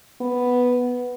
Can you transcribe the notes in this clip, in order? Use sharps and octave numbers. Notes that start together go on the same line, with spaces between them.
B3